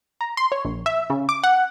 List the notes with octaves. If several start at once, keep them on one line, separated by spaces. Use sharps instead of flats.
A#5
C6
C#5
A#1
E5
C#3
D6
F#5